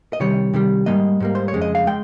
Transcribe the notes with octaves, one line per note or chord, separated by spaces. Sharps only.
D#5
C3 D#3 G3 C#5
C3 D#3 G3
G#2 G3 A#3 D#5
G#2 G3 A#3
C5
C#5
F2 C#3 G#3
D#5
F5
G#3 G5